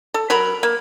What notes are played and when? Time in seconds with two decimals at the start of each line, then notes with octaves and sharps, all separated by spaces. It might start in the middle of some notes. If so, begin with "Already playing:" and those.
0.14 A4
0.30 F#3 A#4 B5
0.63 A#3